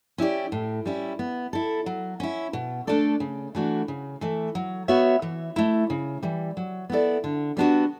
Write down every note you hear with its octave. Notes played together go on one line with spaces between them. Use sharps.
C#4 E4 G4 D5
A2
G3 C#4 E4
B3
E4 A4
F#3
C#4 E4
B2
A3 D4 A4 D5
C#3
E3 A3 D4 F#4
C#3
E3 A3
F#3
B3 F#4 C#5 E5
E3
A3 E4
C#3
E3 G3
F#3
B3 E4 A4 D5
D3
G3 B3 D4 F#4